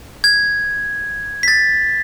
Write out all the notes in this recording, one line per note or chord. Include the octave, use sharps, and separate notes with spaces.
G#6
B6
A6